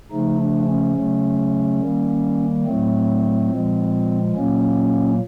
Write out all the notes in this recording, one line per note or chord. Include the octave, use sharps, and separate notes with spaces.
C#3 F3 A3 D#4
D4
C#4
C#3 F#3 A3
D#3 G3 A#3
A2 F#3 A3 C4
A#2 F3 G#3
A#2 F#3 A#3 C#4